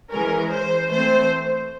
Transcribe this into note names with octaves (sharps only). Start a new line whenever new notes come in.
E3 G#3 C#4 A#4
C5
E3 A3 C4 C5